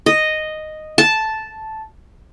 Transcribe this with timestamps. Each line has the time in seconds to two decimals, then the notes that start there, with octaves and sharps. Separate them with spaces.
0.06 D#5
0.98 A5